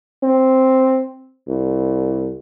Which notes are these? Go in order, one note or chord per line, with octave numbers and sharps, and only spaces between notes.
C4
C2